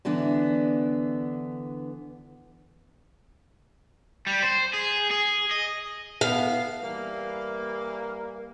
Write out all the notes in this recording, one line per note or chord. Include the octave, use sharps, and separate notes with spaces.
D3 E3 B3 D4
G3
C5
G#4
G#4
D#5
B3 F5
E3 G3 A#3